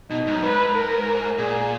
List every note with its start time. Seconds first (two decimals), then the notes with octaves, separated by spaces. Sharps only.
0.10 B2 D#4
0.27 G#2
0.34 F#2
0.42 G#2 B4
0.75 A#4
1.38 A#2 G#4